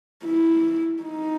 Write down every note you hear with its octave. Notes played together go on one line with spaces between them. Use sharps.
E4
D#4